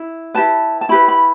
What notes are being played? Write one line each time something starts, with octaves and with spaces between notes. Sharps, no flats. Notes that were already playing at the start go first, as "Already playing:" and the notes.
Already playing: E4
E4 G4 B4 A5
A5
E4 G4 B4 B5
B5